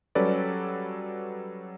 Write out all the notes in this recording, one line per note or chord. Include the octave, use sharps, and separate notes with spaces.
F#3 G3 C#4 A4 B4 D5